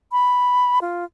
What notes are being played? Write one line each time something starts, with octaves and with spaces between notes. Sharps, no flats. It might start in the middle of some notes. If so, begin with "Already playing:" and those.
B5
F4